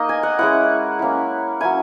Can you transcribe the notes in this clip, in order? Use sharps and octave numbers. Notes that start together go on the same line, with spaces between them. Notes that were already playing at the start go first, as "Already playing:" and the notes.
Already playing: A#3 D#4 D#5
G#5
F#5
G#3 C#4 E4 F#5
A#3 C#4 E4
F#3 C#4 E4 G#5